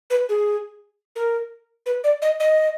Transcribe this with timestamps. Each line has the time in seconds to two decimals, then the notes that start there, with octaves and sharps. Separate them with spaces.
0.10 B4
0.29 G#4
1.16 A#4
1.86 B4
2.04 D5
2.22 D#5
2.40 D#5